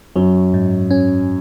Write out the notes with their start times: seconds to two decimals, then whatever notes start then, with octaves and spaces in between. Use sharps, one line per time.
0.16 F#2 F#3
0.54 G#2
0.91 C#4